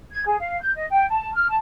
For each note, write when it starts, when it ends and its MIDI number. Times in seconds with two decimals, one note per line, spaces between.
0.11 0.23 92
0.25 0.37 68
0.39 0.59 77
0.60 0.71 91
0.76 0.86 75
0.90 1.04 79
1.08 1.32 81
1.34 1.46 89
1.48 1.56 81